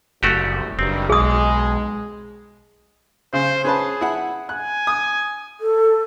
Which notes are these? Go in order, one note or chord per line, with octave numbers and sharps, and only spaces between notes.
F#1 C2 A3 F#4 G4
F#1 G2 D#3 G3 C4
B1 G#3 G#4 D#6
C#3 C5
C#4 G#4 B4 A5
E4 F#5
G#5 F#6
D#6
A4